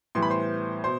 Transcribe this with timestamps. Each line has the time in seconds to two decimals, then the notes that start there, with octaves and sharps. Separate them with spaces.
0.15 A2 E3 G3 B3 C6
0.22 B5
0.30 C5 C6
0.84 B2 C5 C6